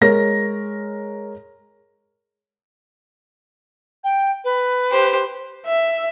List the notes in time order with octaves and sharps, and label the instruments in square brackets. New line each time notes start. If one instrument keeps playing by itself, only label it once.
[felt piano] G#3 A#4 C#5 A#6
[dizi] G5
B4
[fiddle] G4 C5
[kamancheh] E5